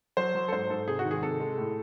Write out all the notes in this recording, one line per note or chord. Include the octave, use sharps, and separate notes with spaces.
F#3 C5
F#3
A4
G#2 C5
G#2 A4
C3 G#4
F#4
D#3
G#4
C3 A4
G#3
A2